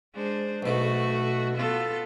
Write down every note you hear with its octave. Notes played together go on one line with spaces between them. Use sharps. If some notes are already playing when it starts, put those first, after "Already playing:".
G#3 D4 C5
B1 B2 A3 F#4
B3 F4 A4